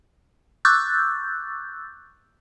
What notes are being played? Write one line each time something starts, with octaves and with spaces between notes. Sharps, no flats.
C#6 D6 E6 F#6 G6 A6